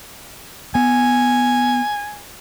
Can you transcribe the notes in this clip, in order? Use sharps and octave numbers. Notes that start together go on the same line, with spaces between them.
B3 G#5